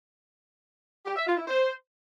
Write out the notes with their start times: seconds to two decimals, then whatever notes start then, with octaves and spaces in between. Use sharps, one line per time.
1.06 G4
1.16 E5
1.27 F4
1.37 E4
1.48 C5